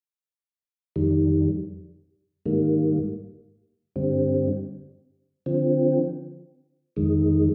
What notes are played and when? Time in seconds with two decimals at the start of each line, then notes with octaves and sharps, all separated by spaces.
0.96 F2 D#3 G3
2.46 G#2 D#3 G3 A#3
3.96 G2 D3 G3 C4
5.46 D3 F3 C4
6.96 F2 D#3 G#3